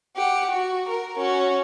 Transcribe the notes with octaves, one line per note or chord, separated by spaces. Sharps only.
G4 F#5
F#4
A#4
C#4 F#4